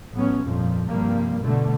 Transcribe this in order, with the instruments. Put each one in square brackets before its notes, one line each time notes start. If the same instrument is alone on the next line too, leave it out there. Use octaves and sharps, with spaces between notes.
[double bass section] A1 A2 F#3 B3 C#4
G1 F2 A#2 F3
G2 C3 F3 G3 A#3
B2 D3 A3